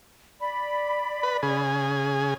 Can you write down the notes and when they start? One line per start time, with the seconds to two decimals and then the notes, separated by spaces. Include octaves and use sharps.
0.39 D5 B5
1.23 B4
1.43 C#3 G#4